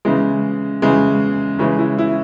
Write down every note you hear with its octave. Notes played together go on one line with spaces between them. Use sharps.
C#3 E3 G#3
C#3 E3 G#3
C#3 E3 G#3 C#4
E4
E4